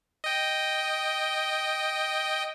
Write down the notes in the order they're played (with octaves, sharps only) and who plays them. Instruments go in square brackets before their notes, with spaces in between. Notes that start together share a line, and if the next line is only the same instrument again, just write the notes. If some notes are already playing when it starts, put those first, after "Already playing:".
[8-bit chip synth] D#5 G5